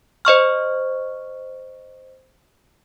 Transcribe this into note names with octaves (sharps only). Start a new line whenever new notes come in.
C5 D#5 C#6 F6